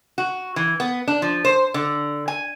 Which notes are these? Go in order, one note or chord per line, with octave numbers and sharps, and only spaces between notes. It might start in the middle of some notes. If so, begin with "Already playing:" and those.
F#4
E3
B3
D4
F3
C5
D3
G#5